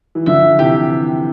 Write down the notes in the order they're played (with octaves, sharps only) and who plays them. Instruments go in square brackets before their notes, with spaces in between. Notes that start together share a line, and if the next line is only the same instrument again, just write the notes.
[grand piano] E3
[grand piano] D3 F3 [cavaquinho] E5
[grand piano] C3 E3 [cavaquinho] G4